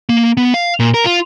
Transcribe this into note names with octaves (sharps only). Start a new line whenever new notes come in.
A#3
B3
F5
A#2
A#4
F4